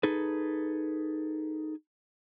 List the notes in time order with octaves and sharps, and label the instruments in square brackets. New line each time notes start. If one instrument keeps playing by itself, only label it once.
[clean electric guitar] D#4 G#4 A4 B4